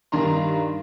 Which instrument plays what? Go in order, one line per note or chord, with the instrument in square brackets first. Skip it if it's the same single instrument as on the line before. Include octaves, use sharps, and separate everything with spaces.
[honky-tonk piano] G2 D#3 D4 A#5 C6